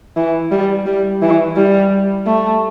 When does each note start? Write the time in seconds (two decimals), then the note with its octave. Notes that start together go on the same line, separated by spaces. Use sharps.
0.16 E3
0.51 G3
0.86 G3
1.22 E3
1.56 G3
2.27 A3